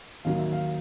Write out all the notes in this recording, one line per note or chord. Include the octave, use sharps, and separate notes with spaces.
D#2 D#3 F#3 A#3 F5
E5
F5